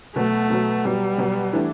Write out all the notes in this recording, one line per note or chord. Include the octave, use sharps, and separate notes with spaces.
B2 F#3 A3 B3
B2 F#3 B3
B2 F#3 G3 B3
B2 F#3 B3
E3 A3 D4